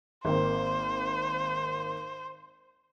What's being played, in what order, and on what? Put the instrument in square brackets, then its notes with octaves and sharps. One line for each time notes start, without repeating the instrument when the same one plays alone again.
[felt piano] G#1 A#3 C4 [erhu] C5